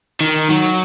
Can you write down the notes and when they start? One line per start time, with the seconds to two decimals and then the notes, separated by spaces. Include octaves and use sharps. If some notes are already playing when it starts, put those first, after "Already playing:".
0.21 D#3
0.50 F#3